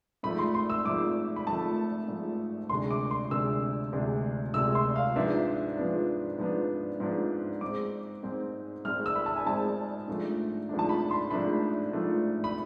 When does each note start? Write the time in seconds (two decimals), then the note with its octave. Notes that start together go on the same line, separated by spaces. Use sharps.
0.23 G#2 F3 A3 B5
0.39 C6
0.54 C6
0.70 E6
0.85 G#2 F3 A3 D6
1.36 B5
1.47 G#2 F3 A3 A5
2.08 G#2 F3 A3
2.69 D2 C3 G#3 D4 C6
2.91 D6
3.11 C6
3.31 D2 C3 G#3 D4 E6
3.92 D2 C3 G#3 D4
4.54 D2 C3 G#3 D4 E6
4.75 C6
4.96 F5
5.15 G#2 F3 B3 D4 E5
5.77 G#2 F3 B3 D4
6.38 G#2 F3 B3 D4
7.00 G#2 F3 B3 D4
7.61 G#2 G#3 C4 D6
8.23 G#2 G#3 C4
8.85 G#2 G#3 C4 F6
9.06 E6
9.16 B5
9.26 A5
9.36 G#5
9.46 G#2 G#3 C4 A5
10.08 G#2 F3 A3 D4
10.69 G#2 F3 A3 D4
10.79 A5
10.89 B5
11.11 C6
11.31 G#2 F3 A3 D4 B5
11.92 G#2 F3 A3 D4
12.44 B5